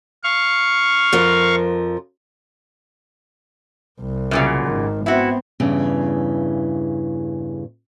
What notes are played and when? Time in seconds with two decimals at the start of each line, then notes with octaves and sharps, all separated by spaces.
0.24 F5 C#6
1.13 F2 F3 A#4
4.01 C2
4.31 F#2 A#2 C#3
4.64 G#1 D#3
5.06 B3 C4 E4 F#4
5.60 E2 G2 C#3 E3